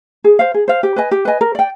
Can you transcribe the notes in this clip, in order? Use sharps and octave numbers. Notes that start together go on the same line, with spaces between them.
G#4
C5 F5
G#4
C5 F5
G4
B4 D#5 G#5
G4
B4 D#5 G#5
A#4
D5 G5